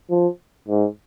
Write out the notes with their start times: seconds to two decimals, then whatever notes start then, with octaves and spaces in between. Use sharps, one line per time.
0.10 F3
0.69 G#2